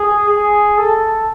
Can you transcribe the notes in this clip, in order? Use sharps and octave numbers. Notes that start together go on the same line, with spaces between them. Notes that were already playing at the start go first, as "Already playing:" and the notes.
Already playing: G#4
G#4
A4